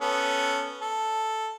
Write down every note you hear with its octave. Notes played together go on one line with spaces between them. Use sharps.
B3 C#4 A4
A4